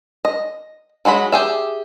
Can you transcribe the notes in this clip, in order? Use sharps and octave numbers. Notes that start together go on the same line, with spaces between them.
D#5
F#3 G#3 F#4 B5
G4 G#4 E5